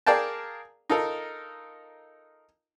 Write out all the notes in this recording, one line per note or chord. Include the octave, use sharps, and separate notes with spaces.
G#4 A#4 D5 F5 G5 A5
D#4 F4 A4 A#4